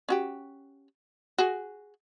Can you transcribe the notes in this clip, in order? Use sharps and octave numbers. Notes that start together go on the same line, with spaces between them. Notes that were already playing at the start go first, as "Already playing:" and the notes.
C#4 F#4 G4
F#4 G#4